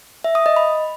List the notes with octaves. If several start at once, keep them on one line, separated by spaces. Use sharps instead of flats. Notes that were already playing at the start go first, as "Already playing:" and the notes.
E5
D#6
D#5
B5